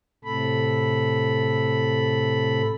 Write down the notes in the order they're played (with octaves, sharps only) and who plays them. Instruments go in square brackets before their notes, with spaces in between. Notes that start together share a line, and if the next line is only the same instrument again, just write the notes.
[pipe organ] A2 C3 A4 B5